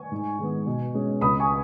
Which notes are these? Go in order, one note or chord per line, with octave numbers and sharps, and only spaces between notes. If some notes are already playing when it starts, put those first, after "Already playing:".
Already playing: G#5 C#6
G#2
D#3 G#3 B3
B2
G#3 C#4
C#2 B5 D#6
G#5 C#6